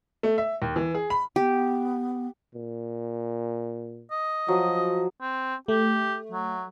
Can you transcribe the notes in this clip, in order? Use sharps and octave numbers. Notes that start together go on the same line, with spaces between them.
A3
E5
D#2
E3
G#4
B5
B3 G4
A#2
D#5
F3 F#3 D#6
C4
A3 G4
F#3